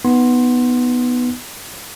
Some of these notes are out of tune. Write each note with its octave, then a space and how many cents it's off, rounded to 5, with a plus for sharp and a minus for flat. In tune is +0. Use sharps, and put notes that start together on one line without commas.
B3 +0 D#4 +0 C6 +10